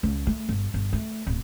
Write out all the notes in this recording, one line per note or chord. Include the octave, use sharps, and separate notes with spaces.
C#2
A3
G1
G1
A3
D1